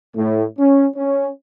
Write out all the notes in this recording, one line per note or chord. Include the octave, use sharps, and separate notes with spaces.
A2
C#4
C#4